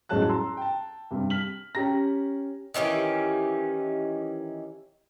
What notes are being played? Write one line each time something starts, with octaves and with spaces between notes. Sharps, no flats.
A1 F#3 G#3 C#5 A5 F#6
A#5 C6 E6
G5 A5
G2 C3 G3
F6 B6 F#7
C#4 G4 A#5 A#6
D#3 E3 C#4 G4